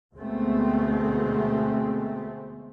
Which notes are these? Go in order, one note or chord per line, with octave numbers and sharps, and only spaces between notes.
D2 B2 G#3 A3 B3 C4